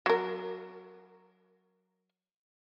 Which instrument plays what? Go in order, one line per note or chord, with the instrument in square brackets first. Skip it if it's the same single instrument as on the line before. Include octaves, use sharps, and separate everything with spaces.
[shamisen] F#3 A#4